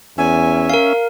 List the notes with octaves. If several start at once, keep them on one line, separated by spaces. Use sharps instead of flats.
E2 C#4 E5 G#5
A#4 F5